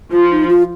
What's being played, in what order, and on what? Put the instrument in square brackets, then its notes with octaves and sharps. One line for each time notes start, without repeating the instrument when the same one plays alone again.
[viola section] F3 [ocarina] F4
[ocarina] D#4
F4